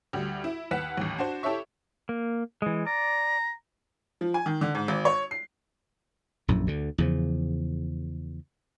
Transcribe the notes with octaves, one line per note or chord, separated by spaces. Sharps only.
D2 G3
E4
D#2 B4 F#5 F#6 B6 E7
A1 D#2
D4 F#4 C5
E4 G4 A4 C#5 E5 C#6
A#3
E3 G#3
D5 A#5
F3
G#5
D#3
D3
G#2
G#1
C#5
C7
A#1 F#2 A2
D2 D3
E2 C#3 F3